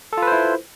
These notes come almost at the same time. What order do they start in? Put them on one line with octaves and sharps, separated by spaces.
A4 F4 B4 C5 E4